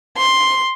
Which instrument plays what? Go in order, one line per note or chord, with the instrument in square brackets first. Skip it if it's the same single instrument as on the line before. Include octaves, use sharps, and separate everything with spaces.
[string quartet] C6